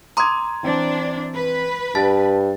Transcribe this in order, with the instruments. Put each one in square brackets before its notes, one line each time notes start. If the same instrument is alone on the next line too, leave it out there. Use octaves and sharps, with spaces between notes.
[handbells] A#5 C6 [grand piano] D6 D#6 G#6
[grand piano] E3 C4 [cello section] D4
[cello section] B4
[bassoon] G2 [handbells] A5 [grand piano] A6